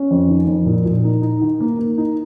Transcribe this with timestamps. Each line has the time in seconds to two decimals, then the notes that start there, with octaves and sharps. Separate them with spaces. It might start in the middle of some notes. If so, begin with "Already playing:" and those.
Already playing: C#4
0.11 F2
0.29 D#3
0.47 F2
0.66 A#2
0.86 A#2
1.04 D#4
1.22 D#4
1.42 D#3
1.60 A#3
1.79 A#3
1.98 D#4